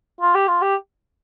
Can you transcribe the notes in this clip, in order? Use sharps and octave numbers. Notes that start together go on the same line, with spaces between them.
F4
G4
F4
G4